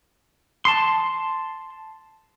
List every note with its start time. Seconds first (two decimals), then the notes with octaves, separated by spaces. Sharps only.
0.65 A5 C6